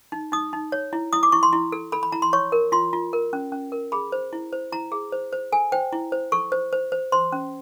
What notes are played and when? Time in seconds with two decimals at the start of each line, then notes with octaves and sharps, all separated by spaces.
0.12 D#4
0.32 D#4 D#6
0.53 D#4
0.72 C#5
0.93 E4
1.13 E4 D#6
1.23 D6
1.32 E4 C#6
1.43 C6
1.53 E4
1.72 A4
1.92 A4 B5
2.03 B5
2.12 E4 A#5
2.22 C6
2.33 C#5 C#6
2.52 A#4
2.72 F4 C6
2.93 F4
3.13 A#4
3.33 C#4
3.52 C#4
3.72 A#4
3.92 G#4 B5
4.12 C5
4.33 E4
4.53 C5
4.72 E4 A#5
4.92 G#4
5.12 C5
5.33 C5
5.52 A4 G#5
5.72 C5 G5
5.93 E4
6.12 C5
6.32 A4 C#6
6.52 C5
6.73 C5
6.92 C5
7.12 C5 C6
7.32 C#4